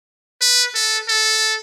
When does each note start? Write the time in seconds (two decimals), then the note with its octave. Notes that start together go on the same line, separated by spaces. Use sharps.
0.41 B4
0.75 A4
1.08 A4